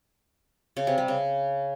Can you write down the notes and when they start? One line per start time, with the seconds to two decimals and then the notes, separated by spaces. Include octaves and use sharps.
0.77 C#3
0.87 C3
0.98 G3
1.08 C#3